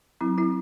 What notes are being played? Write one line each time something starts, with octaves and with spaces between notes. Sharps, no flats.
F#3 C4 E4
C4 E4